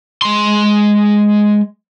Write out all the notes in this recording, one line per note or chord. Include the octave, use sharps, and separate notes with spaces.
G#3 C6